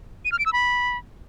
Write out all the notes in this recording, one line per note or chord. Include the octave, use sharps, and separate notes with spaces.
D#7
F6
D7
E6
B5